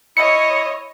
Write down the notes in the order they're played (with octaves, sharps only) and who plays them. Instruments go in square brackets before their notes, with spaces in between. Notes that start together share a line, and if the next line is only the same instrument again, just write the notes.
[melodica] E4 [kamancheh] C#5 D#5 [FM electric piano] C#7